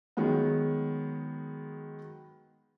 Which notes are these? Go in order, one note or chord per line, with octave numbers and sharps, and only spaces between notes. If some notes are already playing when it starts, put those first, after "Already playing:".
D#3 F#3 G#3 B3